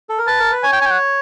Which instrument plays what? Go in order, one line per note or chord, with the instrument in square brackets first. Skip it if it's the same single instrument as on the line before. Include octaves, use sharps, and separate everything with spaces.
[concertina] A4
A#4
[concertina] B4 [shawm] A5
[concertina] A#4
B4
[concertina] C#5 [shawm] G#5
[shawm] G5
G#5
G5
F#5